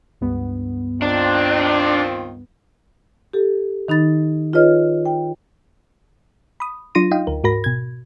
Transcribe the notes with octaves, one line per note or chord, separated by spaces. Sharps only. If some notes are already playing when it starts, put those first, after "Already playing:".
C#2 G2 B3
D#3 C4 D4 F4
G4 A4
D#3 D#4 B5 A6
F4 G#4 B4 C#5 D#5 F6
G5
B5 D#6
F#3 D4 F4 C6 A#6 D#7
D#4 D#5 F5 G5
D2 A#4
G#2 F#4 A#4 B5 A#6
B2 G#6